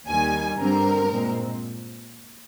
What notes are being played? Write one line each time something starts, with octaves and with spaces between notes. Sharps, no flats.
D#2 D#3 G3 G#5
G2 D3 G3 C4 A#4
A#2 G#3 C4